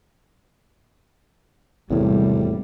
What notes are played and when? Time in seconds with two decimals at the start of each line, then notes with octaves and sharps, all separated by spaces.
1.91 G#1 E2 A2 C3 G3